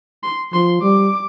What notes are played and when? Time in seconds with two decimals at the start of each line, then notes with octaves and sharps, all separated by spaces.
0.23 C6
0.53 F3 C6
0.82 G3 D6